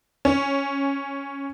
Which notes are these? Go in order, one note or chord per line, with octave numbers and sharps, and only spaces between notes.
C#4